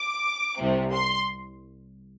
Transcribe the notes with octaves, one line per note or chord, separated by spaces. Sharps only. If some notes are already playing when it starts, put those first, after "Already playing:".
Already playing: D6
C2 C3
C6